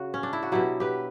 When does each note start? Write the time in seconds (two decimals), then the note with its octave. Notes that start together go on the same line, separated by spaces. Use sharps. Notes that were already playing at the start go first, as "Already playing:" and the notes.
Already playing: C#3 F#4
0.14 C#4
0.23 D4
0.33 E4
0.43 F#4
0.52 B2 F#3 E4 G4
0.80 G4 B4